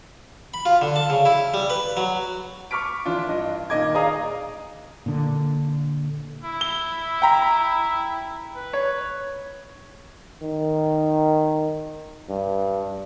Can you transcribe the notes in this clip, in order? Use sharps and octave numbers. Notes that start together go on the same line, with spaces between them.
B5
F4
D3
A5
C#3
E4
G3
B4
F#3
C#6 D6 F6 B6 D7
E3 D4 F4
G2 D#5
A#2 D#3 D#5 D6 G#6
G#4 D5 D#5 F5 A#5 D#6
A#2 D3
E4
G7
G5 A#5 B5
B4
C#5
D#3
G2